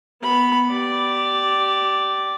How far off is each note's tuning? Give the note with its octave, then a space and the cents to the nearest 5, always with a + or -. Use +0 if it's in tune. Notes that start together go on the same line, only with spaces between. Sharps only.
B3 +0 B5 +0
G4 -20 D5 +0